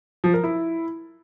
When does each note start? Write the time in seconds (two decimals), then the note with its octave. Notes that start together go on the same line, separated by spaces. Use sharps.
0.24 F3
0.34 A#4
0.44 E4